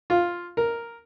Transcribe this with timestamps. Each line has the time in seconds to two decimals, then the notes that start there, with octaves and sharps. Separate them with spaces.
0.10 F4
0.57 A#4